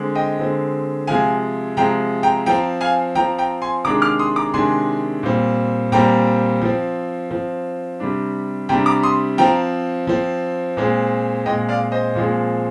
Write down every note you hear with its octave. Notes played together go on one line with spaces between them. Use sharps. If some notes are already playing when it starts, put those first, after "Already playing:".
Already playing: D3 G#3 C4
D#5 G5
D3 G#3 C4
C3 F3 G#3 F5 G#5
C3 F3 G#3 G5 A#5
G5 A#5
F3 C4 G5 A#5
F5 G#5
F3 C4 G5 A#5
G5 A#5
G#5 C6
C3 D#3 G#3 D4 A#5 D6
D6 F6
C6 D#6
A#5 D6
C3 D#3 G#3 D4 G#5 C6
A#2 G3 C4
A#2 G3 C4 G5 A#5
F3 C4
F3 C4
C3 G3 D4
C3 G3 D4 G5 A#5
A#5 D6
C6 D#6
F3 C4 G5 A#5
F3 C4
A#2 G#3 C4
A#2 G#3 C4 D#5 G5
D5 F5
C5 D#5
A#2 F3 G#3 C4